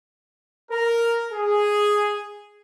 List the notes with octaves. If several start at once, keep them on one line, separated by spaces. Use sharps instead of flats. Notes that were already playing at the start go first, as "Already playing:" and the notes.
A#4
G#4